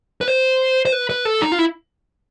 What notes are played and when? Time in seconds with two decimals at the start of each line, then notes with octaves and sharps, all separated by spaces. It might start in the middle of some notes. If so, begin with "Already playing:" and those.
0.21 B4
0.28 C5
0.85 C5
0.92 B4
1.09 B4
1.25 A4
1.42 D#4
1.52 F4
1.59 E4